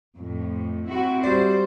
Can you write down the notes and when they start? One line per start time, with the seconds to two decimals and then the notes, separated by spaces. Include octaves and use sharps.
0.17 F2 A2
0.89 C4 E4 F#4
1.23 G3 F#4 C5 D5